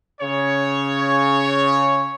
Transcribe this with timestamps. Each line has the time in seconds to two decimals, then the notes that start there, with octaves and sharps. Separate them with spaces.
0.21 C#3 C#5